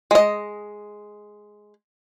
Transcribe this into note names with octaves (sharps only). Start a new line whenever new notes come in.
G#3 D#5